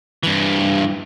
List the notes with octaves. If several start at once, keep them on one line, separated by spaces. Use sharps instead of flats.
G2 E3